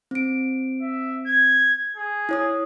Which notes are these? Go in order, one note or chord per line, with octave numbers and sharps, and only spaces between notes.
C4 D7
E5
G#6
G#4
E4 C#5 D#6